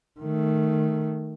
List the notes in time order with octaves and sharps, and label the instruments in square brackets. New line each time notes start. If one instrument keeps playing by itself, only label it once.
[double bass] D#3 A3